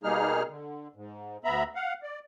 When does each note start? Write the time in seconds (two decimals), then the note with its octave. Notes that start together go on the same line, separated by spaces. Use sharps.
0.04 B2 G3 A#3 D#4 G#4 F6
0.49 D3
0.96 G#2
1.44 D2 B3 E5 A#5 B5
1.75 F5 F#5
2.02 D5